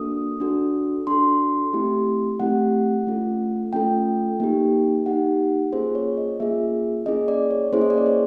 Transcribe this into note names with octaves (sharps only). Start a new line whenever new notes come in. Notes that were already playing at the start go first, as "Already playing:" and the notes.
Already playing: A#3 D4 F#4 A4 D#6
D4 F#4 A4
D4 F#4 A4 C6
A3 C4 E4 G4
A3 C4 E4 G4 F#5
A3 C#4 F4 A4
A3 C#4 F4 A4 G5
A#3 D#4 G4
A#3 D#4 G4 F#5
A#3 C#4 F4 G#4 C5
C#5
D#5
A#3 C#4 F4 G#4 E5
A#3 C#4 E4 G#4 D#5
D5
C#5
A#3 C#4 E4 G#4 C5
D#5
D5
C#5
C5